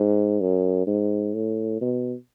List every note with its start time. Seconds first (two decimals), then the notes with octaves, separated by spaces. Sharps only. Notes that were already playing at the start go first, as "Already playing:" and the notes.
Already playing: G#2
0.41 F#2
0.87 G#2
1.34 A2
1.81 B2